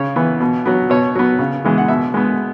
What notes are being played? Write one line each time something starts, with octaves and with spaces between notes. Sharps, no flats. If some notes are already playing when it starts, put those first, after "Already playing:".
Already playing: C#3 C#5
E3 B3
B2
F#3 B3
B2 C#5
F#3 B3
C#3
E3 G#3 B3
F#5
B2 E5
G#3 B3